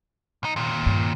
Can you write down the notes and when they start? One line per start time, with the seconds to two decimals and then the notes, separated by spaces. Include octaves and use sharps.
0.43 B1 D#4
0.56 D#2 A#2
0.86 G2